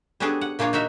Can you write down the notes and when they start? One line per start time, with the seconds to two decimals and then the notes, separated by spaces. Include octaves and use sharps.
0.20 G3 B3 C#4 D4 G#4 A4
0.41 F#5
0.59 A#2 A#3 D4 F4 C#5
0.73 D#4 F#4 A#4 E5